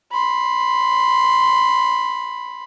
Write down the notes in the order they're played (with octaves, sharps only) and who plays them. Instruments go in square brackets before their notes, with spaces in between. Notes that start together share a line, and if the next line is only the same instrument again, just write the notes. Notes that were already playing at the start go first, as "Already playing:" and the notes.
[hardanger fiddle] B5 C6